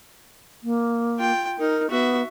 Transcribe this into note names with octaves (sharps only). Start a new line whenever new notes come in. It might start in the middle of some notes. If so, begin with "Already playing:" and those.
A#3
F4 G5
D#4 A#4
B3 F#4 E5